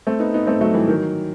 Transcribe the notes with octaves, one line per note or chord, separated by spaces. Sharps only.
A3 C4
B3 D#4
B3 D#4
A3 C4
F#3 A3
E3 G3
D#3 F#3